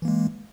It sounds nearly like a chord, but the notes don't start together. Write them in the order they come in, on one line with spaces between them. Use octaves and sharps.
E3 A#3 G#3